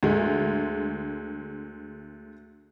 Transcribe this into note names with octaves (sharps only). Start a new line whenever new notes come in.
D2 G#3